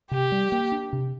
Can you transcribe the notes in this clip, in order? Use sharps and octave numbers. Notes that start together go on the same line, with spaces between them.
C3 G4
G3
A#3
D4
C3